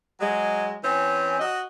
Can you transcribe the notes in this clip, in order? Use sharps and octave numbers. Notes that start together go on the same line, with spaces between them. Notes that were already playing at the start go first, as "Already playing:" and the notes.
F#3 G#3
E3 C4 C#4
F#4 D#5